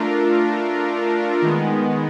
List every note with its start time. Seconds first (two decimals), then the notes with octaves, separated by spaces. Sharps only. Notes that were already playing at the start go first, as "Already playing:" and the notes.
Already playing: A3 D4 F4 A#4
1.42 D#3 G#3 B3